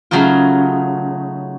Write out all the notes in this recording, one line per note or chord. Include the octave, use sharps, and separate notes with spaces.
C#3 F#3 A3 D#4 F4